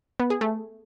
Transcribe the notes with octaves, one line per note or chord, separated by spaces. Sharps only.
B3
G#4
A3